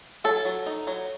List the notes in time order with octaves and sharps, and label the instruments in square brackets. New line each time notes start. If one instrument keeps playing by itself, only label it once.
[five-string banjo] F#3 A4
F#3
D#4
F#3